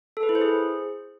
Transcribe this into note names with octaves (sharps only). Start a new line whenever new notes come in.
A4
B4
E4
C5
G#4